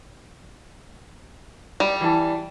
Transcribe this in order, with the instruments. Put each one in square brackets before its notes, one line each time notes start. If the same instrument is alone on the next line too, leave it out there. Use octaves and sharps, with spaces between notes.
[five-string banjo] G3
[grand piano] E3 A5